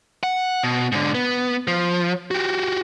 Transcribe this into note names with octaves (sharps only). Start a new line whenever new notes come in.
F#5
B2
G#2 D3
B3
F3
F#4 G4